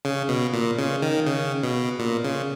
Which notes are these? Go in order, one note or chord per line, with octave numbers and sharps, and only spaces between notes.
C#3
B2
A#2
C#3
D#3
C#3
B2
A#2
C#3